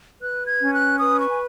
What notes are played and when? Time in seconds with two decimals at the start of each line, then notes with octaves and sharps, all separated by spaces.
0.20 B4 F#6
0.47 G#6
0.60 C#4
0.73 F#6
0.99 B4 D#6
1.19 C#6
1.30 G#5